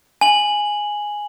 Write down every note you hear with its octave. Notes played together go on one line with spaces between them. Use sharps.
G#5 F#7